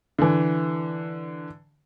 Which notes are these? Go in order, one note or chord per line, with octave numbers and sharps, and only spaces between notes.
D3 E3